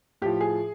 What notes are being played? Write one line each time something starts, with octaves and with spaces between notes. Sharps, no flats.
A2 F3 G4
G#4